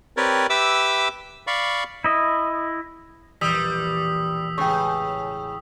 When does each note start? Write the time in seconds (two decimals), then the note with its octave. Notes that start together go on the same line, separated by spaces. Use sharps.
0.17 C4 G4 A#4 B4 C#5 D5
0.50 G4 B4 E5 D6 E6
1.47 D5 F5 B5 C#6
2.04 E4 D#5
3.41 E1 A#1 E3 G3 D#6 E6 B6
4.58 A1 C#3 G#3 C#5 G5 C#6